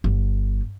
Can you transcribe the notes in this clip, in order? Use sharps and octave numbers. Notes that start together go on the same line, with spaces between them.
G1